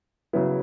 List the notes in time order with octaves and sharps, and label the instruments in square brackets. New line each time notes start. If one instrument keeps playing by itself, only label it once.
[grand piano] C#3 F#3 B3 E4